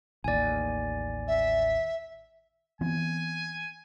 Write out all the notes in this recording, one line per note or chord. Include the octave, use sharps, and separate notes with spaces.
A1 D#2 D5 G#5
E5
E3 B3 C4 G#5